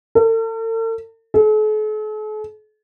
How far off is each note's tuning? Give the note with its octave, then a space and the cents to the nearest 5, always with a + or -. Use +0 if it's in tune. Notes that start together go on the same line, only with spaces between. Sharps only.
A4 +45
A4 -45